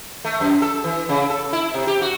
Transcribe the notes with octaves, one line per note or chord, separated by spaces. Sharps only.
A3
F#2
A4
E3
C#3
A4
E4
C3
G4
F#4